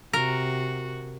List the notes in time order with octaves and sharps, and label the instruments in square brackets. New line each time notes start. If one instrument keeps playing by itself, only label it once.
[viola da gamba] C3 F#4 [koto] A#4